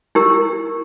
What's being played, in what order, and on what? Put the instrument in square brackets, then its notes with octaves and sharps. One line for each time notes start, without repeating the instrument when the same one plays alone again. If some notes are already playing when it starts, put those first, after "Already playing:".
[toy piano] E4 G4 A#4